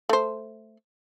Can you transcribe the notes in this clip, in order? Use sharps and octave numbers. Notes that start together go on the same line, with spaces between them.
A3 C5